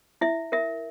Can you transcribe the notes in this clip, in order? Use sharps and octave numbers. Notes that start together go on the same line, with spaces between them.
E4 E5
A#4 E5